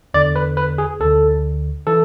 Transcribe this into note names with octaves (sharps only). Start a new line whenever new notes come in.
E2 D3 D5
B4
B4
G#4
D2 D3 A4
E3 A4